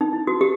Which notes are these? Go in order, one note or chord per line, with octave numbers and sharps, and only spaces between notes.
D#4
E4
F#4
G4